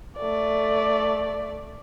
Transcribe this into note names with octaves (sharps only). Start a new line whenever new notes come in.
A3 D5